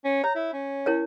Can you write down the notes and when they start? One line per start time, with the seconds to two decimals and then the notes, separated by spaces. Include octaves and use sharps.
0.05 C#4
0.24 C#5 A#5
0.35 E4
0.53 C#4
0.86 E4 A#4 C#5